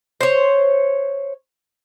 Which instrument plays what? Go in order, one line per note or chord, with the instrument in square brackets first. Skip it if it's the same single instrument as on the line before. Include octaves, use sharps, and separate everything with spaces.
[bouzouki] C5 C#5